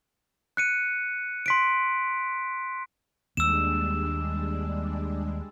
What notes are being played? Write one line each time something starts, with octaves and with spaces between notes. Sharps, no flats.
F#6 C#7 D#7
C6 B6 D7
D#2 G3 G#3 A#3 D4 E6 E7